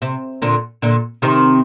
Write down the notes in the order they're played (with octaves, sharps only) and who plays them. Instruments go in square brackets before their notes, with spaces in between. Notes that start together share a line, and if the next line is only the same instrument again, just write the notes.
[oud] C3
A#2 D3
A#2 D3
C3 D#3